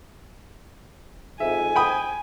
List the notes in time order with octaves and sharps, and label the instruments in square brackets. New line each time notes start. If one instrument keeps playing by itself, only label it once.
[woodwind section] F2 G#2 [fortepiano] E5 [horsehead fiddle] G#5
[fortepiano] G5 B5 D#6